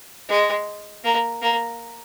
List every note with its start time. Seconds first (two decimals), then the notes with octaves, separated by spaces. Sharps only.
0.29 G#3
1.04 A#3
1.42 A#3